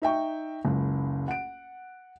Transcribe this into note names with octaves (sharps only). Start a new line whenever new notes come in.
D#4 E5 G5 C#6
F#1 C#2
F#5 D7